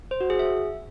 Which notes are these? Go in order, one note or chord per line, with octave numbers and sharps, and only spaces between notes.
C5
F#4
G#4
E5